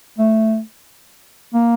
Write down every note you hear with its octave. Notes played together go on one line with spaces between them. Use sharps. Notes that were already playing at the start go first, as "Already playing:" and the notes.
A3
A#3